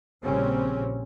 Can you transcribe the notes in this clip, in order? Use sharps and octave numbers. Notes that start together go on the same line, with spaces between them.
A#1 A#2 C#3 G3 C4 C#4